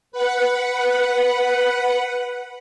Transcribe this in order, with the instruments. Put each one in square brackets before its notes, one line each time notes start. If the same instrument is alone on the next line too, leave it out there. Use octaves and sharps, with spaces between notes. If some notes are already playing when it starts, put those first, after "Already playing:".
[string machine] B4 F#5